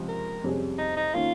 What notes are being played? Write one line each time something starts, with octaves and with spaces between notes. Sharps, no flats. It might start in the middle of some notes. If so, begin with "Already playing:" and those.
Already playing: C#2 C3 F3
A#4
F2 C3 G3 C#4 G#4
D#4
D#4
D#3 A#3 C#4 F4